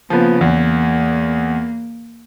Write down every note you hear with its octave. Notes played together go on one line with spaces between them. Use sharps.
C#3 F3 A#3 B3
E2 A#3